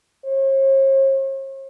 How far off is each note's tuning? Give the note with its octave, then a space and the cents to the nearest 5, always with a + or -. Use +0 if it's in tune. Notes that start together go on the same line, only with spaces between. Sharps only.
C#5 -45